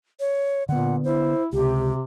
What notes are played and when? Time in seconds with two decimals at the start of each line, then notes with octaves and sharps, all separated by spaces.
0.20 C#5
0.69 A#2 D3 B3 F#5
1.04 E4 C5
1.53 C#2 C3 G4